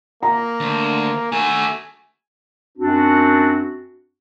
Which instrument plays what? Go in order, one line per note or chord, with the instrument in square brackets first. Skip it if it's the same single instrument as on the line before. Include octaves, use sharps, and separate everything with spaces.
[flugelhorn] A#3 [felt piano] A#5
[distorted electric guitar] D2
[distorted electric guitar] A3 F#4 [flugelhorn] G#5
[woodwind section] F#2 C4 D4 F#4